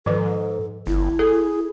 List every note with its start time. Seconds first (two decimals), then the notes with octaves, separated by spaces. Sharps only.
0.06 G#2 D#3 F3 A4 B4
0.87 G1 E4
1.19 G#4 A4